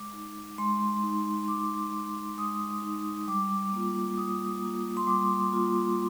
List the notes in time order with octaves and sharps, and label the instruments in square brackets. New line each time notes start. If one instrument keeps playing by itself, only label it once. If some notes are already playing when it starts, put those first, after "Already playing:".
Already playing: [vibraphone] G#3 D6
D#4
G#3 C6
D#4
G#3 D6
D#4
G#3 D#6
D#4
G3 D6
A#3 F4
G3 D#6
A#3 F4
C6
G3 D6
A#3 F4